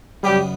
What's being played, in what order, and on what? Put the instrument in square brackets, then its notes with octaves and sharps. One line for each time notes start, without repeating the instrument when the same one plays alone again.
[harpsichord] F#2 C#3 F#3 B3 D4 [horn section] G3 G4